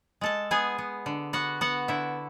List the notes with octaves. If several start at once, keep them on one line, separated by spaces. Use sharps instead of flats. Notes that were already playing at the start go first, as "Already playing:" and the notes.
G#3 A4 A5
B3 G#4 G#5
B3
D3
B3 F#4 F#5
B3 F#4 F#5
D3 E4 E5